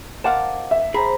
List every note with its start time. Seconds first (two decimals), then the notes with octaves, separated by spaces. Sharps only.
0.24 A#4 C5 D#5 F5 F#5 A5 D6
0.71 E5
0.94 G#4 C5 A#5 B5